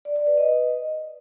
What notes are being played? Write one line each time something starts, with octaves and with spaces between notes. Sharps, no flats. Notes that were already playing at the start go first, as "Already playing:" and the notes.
D5
D5
B4
D#5